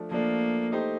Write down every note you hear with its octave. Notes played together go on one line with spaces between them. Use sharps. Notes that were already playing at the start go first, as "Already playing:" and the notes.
Already playing: F3 A3 D4
F3 A3 A#3 D4
A3 D#4 G4 C5